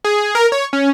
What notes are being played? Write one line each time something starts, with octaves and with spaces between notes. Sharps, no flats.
G#4
A#4
C#5
C#4